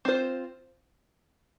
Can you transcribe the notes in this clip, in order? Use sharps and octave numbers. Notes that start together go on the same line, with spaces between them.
C4 F4 C5